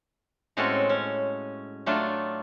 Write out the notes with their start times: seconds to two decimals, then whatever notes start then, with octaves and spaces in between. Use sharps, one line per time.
0.57 A2 G#3 C4 C#4 F#4 A4
0.89 C#4
1.86 F#3 A3 D4 F4